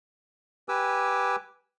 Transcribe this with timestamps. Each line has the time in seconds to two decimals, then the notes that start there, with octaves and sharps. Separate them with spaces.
0.69 G4 B4 G#5 D6 E6